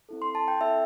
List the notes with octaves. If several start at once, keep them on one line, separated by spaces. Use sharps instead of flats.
C4 E4 A4
C6
A5
G5
C4 E4 A4 E5